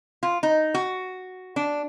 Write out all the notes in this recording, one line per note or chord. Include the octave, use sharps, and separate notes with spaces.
F4
D#4
F#4
D4